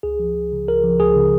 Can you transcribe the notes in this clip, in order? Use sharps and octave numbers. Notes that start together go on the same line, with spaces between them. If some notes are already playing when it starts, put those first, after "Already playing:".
C#2 G#4
F3
C#2
C#3
C#2 A#4
F3
C#2 G#4
C#3